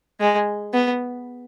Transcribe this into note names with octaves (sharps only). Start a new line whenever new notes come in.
G#3
B3